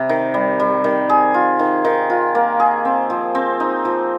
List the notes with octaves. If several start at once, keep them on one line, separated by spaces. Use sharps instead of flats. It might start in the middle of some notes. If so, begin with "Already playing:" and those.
Already playing: C3 G3
D#3
G3
G3
D#3
G#4
F4
D#3
D#3
F4
A#3
G#4
C4
F3
C4
D#4
F3